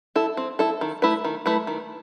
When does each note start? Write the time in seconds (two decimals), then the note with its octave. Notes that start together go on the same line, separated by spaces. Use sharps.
0.16 E4 A4
0.37 C4
0.59 E4 A4
0.81 D#3
1.02 A3 E4 B4
1.24 D#3
1.46 A3 E4 B4
1.67 D#3